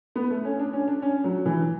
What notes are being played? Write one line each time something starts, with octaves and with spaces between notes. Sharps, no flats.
B3
A3
C#4
D4
C#4
D4
C#4
F#3
E3